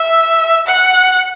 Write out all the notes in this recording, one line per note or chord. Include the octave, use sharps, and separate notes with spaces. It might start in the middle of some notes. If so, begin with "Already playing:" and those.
Already playing: E5
F#5